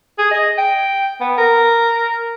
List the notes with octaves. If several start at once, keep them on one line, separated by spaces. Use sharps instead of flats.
G#4
D#5
G5
B3
A#4